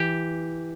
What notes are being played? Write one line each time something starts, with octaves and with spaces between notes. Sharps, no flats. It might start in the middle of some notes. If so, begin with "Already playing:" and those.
Already playing: E3 G4